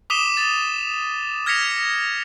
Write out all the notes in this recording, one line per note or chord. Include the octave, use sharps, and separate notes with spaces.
D6 D#6 B6 D#7 E7 G7
A6
F6 G#6 A#6 B6 C#7 F7